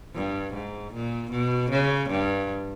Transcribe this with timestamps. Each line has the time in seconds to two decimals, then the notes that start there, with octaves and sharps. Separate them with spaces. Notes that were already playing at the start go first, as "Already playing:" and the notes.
0.15 G2
0.53 G#2
0.93 A#2
1.31 B2
1.70 C#3
2.10 G2